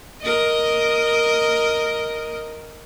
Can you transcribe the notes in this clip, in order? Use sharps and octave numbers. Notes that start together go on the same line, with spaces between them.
A#4 D#5